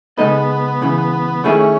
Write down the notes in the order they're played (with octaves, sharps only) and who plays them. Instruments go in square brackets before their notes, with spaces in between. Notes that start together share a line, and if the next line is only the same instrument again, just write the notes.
[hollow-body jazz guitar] C#3 G#3 D#4 A4 D#5 [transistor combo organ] B3
[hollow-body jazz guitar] C#2 C#3 E3
[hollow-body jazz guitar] D#3 A3 E4 G#4 [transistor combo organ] C#4